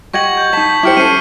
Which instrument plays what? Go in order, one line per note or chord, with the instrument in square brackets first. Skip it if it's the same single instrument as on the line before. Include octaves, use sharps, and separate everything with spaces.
[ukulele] G4 D#5 F#5 [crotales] C#6 G#6 F#7
[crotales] G6
[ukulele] D#4 A5 [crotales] B6
[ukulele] E4 G4 C5 [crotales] D6 F6 C#7
[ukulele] C#4 A4 [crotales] C7 D#7